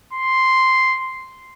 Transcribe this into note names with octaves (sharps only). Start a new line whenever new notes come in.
C6